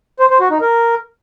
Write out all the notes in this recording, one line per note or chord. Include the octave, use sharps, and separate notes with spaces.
C5
C5
F#4
D#4
A#4